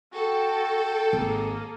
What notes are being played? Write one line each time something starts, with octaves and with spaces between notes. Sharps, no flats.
F#4 A4 G5
G#1 A#3 G#4